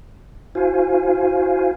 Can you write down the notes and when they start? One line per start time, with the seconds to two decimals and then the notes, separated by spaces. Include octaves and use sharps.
0.55 E4 F#4 C5 F5 G#5